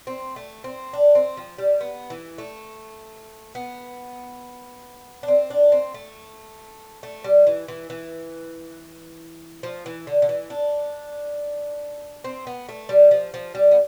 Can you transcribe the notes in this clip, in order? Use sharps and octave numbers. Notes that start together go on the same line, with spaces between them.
C4
A3
C4
D4
C4
F3
G3
B3
E3
A3
B3
D4
C4
D4
C4
A3
A3
G3
E3
E3
E3
F3
E3
D3
D3
E3
D4
C4
B3
A3
G3
F3
F3
G3
B3